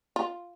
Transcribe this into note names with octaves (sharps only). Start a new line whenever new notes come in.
F4